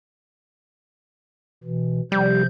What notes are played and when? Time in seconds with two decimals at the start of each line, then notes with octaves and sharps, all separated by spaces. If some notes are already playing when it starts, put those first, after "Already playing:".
1.64 B2 E3
2.12 C3 F3 G3 G6